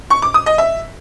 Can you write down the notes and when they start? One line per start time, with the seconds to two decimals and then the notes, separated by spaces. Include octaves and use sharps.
0.10 C#6
0.22 D6
0.34 D#6
0.46 D#5
0.58 E5